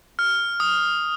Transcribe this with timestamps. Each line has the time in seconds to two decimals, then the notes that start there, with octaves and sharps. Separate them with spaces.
0.19 F6
0.60 D#6